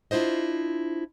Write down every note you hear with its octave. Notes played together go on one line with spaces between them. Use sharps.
D4 E4 F4 C5 D#5